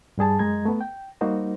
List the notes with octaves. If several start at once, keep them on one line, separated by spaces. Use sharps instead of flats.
G2 G3 G#4 A5
F#2 G#3 D#5 A#5 G#6
A3 B3
G5
G3 A#3 D#4 F#4 C5